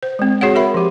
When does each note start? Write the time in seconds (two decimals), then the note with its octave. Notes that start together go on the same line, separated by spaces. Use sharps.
0.03 C5
0.19 G#3 C4
0.41 F#4 G#4 C#5 F#5
0.55 A#4 E5 B5
0.74 F3 G4